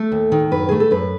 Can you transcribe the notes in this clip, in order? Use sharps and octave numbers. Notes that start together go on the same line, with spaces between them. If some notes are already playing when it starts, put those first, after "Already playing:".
Already playing: A3 A4
D#2
D#3
F#2 B4
A3 G#4
A4
F#2 B4